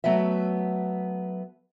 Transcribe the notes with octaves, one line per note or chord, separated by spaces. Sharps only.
F#3 A3 B3 E5